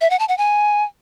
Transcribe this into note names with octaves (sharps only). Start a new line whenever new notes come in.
E5
F#5
A5
F#5
G#5